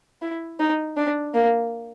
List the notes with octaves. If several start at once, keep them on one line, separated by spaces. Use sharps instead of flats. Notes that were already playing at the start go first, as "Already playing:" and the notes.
E4
D#4
D4
A#3